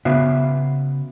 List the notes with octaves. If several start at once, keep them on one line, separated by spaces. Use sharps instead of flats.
C#3 B3 F#4 E5 F5